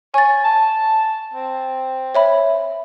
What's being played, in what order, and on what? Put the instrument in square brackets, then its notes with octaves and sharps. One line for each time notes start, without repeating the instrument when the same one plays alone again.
[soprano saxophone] C#5 [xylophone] G#5 A6
[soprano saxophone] A5
C4
[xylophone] C#5 E5 B5